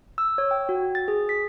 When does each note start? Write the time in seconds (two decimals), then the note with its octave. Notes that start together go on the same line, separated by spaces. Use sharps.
0.18 E6
0.38 C#5
0.51 G5
0.69 F#4
0.95 A6
1.08 G#4
1.29 B6